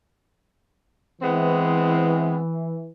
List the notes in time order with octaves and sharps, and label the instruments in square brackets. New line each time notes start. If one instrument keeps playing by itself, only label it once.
[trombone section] E3 [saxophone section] G#3 B3 C4